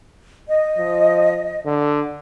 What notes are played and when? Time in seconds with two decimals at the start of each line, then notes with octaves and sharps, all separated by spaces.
0.48 D#5
0.78 F3
1.65 D3